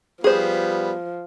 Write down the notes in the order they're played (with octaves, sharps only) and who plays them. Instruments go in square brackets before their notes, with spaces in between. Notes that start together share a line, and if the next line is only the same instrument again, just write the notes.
[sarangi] F3 [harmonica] G3 B3 [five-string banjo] G#4 C5